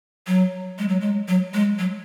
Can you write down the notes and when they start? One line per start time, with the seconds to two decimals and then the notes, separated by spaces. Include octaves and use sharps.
0.27 F#3
0.79 G#3
0.89 F#3
1.01 G#3
1.28 F#3
1.54 G#3
1.79 F#3